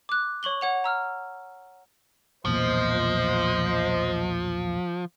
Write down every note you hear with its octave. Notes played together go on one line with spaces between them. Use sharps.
D6 F#6
C#5 C#6 F#7 G7
C#5 F#5 F7
A#5 E6 F6
B1 E2 A#2 F3 C5 D#5